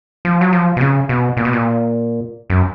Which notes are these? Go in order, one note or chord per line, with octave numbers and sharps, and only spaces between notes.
F3
F#3
F3
B2
C#3
B2
A#2
B2
A#2
F#2